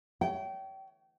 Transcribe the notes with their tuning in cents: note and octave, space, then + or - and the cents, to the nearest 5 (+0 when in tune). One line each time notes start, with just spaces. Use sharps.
C#5 +20 G5 -25